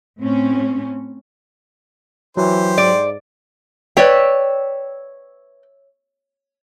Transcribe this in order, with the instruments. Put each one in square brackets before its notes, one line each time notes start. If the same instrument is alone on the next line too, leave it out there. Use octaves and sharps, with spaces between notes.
[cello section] A2 C4 C#4
[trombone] E3 [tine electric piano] F#3 [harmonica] G4 C5
[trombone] G#2 [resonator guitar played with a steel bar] D5
[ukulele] B4 D5 G5 [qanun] C#5 E5